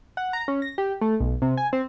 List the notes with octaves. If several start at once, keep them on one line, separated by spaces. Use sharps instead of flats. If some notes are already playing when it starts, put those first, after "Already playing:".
F#5
A#5
C#4
A#6
G4
A3
B1
C3
G#5
C4